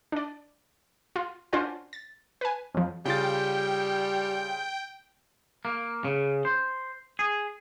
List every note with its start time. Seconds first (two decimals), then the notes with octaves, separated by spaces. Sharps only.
0.12 D4 D5
1.16 F4
1.53 C#4 D4 F4 C5 D5 F#5
1.93 A6
2.41 B4 G#5
2.74 F2 F3
3.05 C#3 G3 F4 G5 A6
5.65 A#3
6.04 C#3
6.45 C5
7.19 G#4